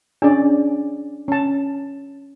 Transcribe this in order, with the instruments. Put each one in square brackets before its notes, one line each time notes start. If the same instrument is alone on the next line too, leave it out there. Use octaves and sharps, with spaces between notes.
[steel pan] C#4 G#4 D5 [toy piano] D4
[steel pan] C#4 A5